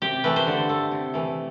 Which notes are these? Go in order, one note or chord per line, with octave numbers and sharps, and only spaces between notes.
C3 G4
E3 A3 B4
C5
D3
A3
C3
E3 A3